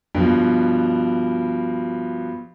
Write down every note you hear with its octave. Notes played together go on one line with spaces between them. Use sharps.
G2 B2 F3